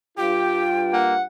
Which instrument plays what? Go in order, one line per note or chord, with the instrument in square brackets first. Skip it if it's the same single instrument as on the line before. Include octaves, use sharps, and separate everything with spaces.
[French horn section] G2 F4 [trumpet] G4 [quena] G5
[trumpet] A#3 [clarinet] F#5